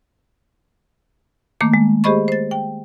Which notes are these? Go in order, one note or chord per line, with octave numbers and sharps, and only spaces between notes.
D#3 A3 A#3 D6
G#3
G4 G#4 C5 D#5 B5 C#6
C5 A6
G5